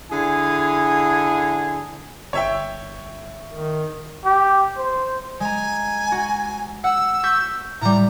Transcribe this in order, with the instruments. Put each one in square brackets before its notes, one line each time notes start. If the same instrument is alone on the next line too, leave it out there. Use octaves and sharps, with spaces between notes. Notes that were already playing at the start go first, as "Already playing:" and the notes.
[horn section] D3 E4 G#4 G#5
[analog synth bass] G1 [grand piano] C#5 E5 G5
[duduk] D#3
[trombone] G4
C5
[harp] G#3 A#5 [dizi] G#5
[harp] F#4
[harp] F#5 [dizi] E6
[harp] C#6 G6 B6
[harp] A2 G3 [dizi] A#5